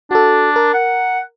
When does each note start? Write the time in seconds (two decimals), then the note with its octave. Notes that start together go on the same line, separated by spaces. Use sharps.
0.11 D4 F#4 A4
0.56 A#4
0.74 F#5